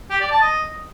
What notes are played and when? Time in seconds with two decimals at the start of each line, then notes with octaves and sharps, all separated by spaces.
0.10 G4
0.21 D5
0.31 A5
0.42 D#5